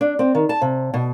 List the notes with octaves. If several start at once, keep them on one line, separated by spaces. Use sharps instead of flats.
D4
C4
D#3
A5
C3
B2